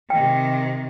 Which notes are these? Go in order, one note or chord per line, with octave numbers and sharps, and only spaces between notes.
C3 D#3 G5